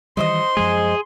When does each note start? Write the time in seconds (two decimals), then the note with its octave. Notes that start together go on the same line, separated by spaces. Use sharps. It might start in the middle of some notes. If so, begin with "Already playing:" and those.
0.17 D#3 E3 G3 D#4 C5 D#5 C6
0.57 F#2 F3 G#3 G#4